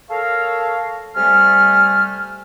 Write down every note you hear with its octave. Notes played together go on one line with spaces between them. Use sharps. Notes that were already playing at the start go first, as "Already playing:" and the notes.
A4 A#4 C#5 F5
C3 G3 A3 G#5 F6